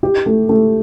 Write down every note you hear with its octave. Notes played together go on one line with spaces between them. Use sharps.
G4
A3
A3